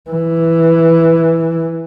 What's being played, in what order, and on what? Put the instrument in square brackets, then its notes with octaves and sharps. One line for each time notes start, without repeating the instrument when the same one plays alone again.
[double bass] E3